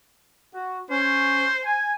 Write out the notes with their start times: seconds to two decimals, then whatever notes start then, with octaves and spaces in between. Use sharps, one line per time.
0.55 F#4
0.90 C#4 C5
1.65 G#5